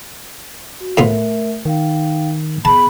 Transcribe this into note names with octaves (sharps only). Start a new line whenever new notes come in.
F#4
A2 A3 B3 F4 A#4 E5
D#3 D#4 F5 G5
B3 G#4 A5 B5